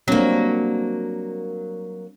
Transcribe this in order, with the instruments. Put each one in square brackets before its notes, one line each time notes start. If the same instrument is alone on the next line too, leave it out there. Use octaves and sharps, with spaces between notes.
[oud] F#3 A#3 [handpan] G3 C4 D4